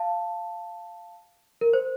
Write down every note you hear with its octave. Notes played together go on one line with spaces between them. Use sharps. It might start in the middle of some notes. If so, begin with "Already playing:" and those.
Already playing: F5 A5
A#4
C5